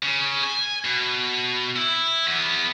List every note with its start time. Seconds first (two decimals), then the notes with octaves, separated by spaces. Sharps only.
0.03 C#3
0.43 G#5
0.85 B2
1.76 E4
2.27 E2 B3